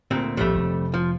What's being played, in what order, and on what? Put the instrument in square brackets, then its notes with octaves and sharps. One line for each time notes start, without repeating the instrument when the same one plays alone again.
[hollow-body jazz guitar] D2 A#2 C4
[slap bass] A#1 A2 [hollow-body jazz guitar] F2 G3 A3
[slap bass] F1
[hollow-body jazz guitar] F3